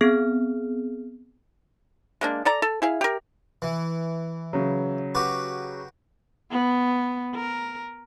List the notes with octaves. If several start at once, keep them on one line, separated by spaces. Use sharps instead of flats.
B3 C4 G#4 F6
G#3 A#3 D4
A4 D5 A#5
A4
E4 G#4 F5
G4 A#4
E3
C#3 F#3
F#4 G4 B4
B3
A#4